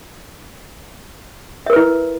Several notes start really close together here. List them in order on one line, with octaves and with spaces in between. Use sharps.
E5 A#4 B4 E4